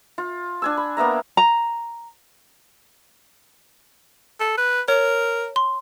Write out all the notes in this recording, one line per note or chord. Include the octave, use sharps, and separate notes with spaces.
F4
D4 G#5 E6
B5
A#3 B3 E5 A#5
A#5
A4
B4
A#4 C#5
C6